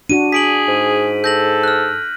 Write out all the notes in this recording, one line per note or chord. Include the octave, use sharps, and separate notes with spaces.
D4 F#4 D#7
G#4 B6 D7 F#7
G#2
A4 G6 A#6 F#7
F6 F#6